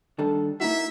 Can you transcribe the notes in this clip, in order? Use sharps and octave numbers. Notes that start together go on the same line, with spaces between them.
D#3 G3 D4 A4
A#3 D#4 E4 F#4 E5